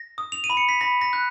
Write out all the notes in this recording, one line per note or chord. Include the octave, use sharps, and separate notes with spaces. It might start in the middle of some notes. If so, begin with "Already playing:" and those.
Already playing: A#6
D#6
F7
D#7
B5
C#7
B6
B5 A#6
A#6
F#6